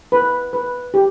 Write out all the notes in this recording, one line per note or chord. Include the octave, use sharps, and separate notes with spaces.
B4
B4
G4